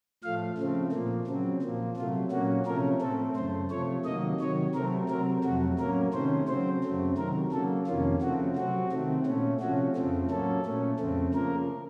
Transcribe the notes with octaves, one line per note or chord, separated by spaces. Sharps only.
A2 F3 A3 F5
C#3 F3 A3 C4
A#2 F3 A#3
C#3 F#3 C4
A#2 F3 A#3
C3 F#3 A3 F4
A#2 F#3 A#3 C#4 F#4
C3 F3 A3 C#4 A#4
A2 A3 C4 A4
F#2 C#3 A3 C5
C3 F3 A3 C#5
C3 D#3 F#3 A#3 D#5
C3 D#3 F#3 C#5
C3 F#3 A3 C4 A#4
C3 F#3 C4 A#4
F2 C3 F#3 A3 F#4
A2 F#3 A#3 C#4 A#4
C3 D#3 A3 C#4 C5
C#3 F#3 C4 C5
F#2 C#3 F#3 A3 C4
C3 D#3 F#3 A#4
C#3 F#3 A#3 A4
F2 C3 D#3 A#3 C#4 F4
C#3 F3 A3 C4 F#4
C3 F#3 C4 F#4
C3 D#3 A3 C4
A#2 A3 C#4
C3 F3 A3 C#4 F#4
F2 C#3 F3 A3 C4
A2 F#3 A#3 C#4 A4
A#2 A3 C#4
F2 C#3 A3 C4
C#3 F3 A#3 A#4